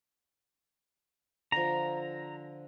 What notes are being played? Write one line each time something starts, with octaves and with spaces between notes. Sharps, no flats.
D3 F3 A#5